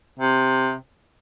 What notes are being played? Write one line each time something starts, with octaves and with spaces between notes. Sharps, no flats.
C3